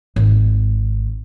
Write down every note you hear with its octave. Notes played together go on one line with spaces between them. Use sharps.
G#1